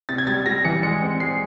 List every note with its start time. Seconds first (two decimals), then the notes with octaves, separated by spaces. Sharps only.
0.09 C3 A6
0.18 G#6
0.27 G3 A6
0.46 G3 A#6
0.65 E3 C#7
0.83 G#3 C#7
1.02 C4
1.20 G#3 C7